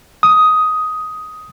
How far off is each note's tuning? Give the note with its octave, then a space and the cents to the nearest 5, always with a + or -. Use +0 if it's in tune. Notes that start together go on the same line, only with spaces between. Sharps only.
D#6 +10